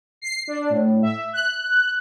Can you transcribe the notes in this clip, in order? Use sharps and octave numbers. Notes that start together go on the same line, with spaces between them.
C7
D4
A2
E5
F#6